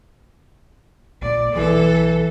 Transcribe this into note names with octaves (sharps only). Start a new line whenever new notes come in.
A#1 A#2 D5
B1 E3 A4